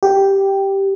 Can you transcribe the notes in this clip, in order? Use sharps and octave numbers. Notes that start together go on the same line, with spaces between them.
G4